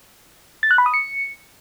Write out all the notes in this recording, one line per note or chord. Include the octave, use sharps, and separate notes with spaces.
A6
F#6
B5
D#6
C#7